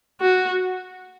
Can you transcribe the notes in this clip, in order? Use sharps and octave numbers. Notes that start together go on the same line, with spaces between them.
F#4